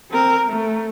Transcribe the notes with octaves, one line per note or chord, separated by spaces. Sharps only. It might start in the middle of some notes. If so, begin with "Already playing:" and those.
C4 A#4
A3